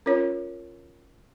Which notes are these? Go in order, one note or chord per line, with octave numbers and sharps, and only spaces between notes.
C#4 F4 A#4 C#5